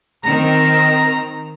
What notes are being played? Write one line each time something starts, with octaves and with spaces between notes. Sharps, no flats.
D#3 C4 A#5